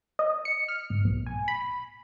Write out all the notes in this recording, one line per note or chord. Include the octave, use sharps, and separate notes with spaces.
D#5
C#7
F6
G#1
B1
G#5
B5